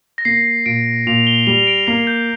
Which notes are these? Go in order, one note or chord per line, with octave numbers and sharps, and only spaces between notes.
A#6
A#3 C7
A#2 D7
A#2 F7
G7
G3 F7
D7
A#3 C7
G6